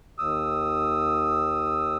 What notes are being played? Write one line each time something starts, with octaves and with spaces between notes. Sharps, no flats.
D#2 D#6 E6